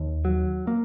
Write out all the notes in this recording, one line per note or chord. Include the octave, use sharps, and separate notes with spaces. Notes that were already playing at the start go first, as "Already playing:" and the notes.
Already playing: D#2
F#3
A#3